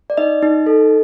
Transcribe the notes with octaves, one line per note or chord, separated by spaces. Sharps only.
D5
D#4 D#5
D#4
A4